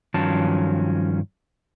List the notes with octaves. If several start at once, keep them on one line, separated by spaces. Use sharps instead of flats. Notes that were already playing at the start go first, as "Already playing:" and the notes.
G2 D#3 F3 F#3 C#4 A5